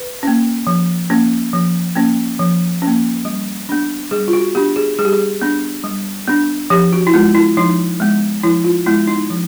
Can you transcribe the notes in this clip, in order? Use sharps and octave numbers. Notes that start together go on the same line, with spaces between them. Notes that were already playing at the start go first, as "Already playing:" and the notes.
Already playing: B4
A#3 C#4
F3
A#3 C#4
F3
A#3 C#4
F3
A#3 C#4
G3
B3 D4
G3 G#4
F4
F#4
B3 D4 G4
G#4
G3 G#4
G4
G#4
B3 D4
G3
B3 D4
F3 G4
F#4
E4
G#3 B3 F4
E4
F3 D#4
G#3 B3
F3 E4
F4
G#3 B3 E4
D#4
F3